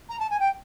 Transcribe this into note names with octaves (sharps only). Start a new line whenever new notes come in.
A#5
A5
G#5
G5